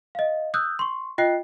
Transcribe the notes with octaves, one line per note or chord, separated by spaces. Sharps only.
D#5 F5
D#6 E6 F#6 G6
C6 C#6
F4 D#5 G5 F#6 C7